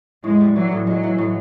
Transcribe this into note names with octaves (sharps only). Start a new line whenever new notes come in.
A2 G#3
G3
E3 F#3
A2
F#3 G#3
E3
A2